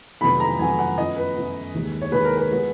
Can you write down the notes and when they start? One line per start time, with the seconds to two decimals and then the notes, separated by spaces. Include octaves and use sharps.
0.21 F1 F2 D#3 F#3 B3 B5
0.40 A#5
0.59 F1 F2 D#3 F#3 B3 G#5
0.79 F#5
0.98 F#2 F3 B3 D#5
1.17 B4
1.36 F#2 F3 B3
1.74 D#2 D#3 G#3
2.01 C#5
2.12 D#2 D#3 G#3 B4
2.25 A#4
2.37 B4
2.51 F3 G#3 B3